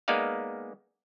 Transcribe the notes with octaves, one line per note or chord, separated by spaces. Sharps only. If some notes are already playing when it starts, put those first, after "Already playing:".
G#3 A#3 B3 D#4 D5 F5